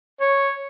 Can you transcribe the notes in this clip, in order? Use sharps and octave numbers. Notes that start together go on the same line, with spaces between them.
C#5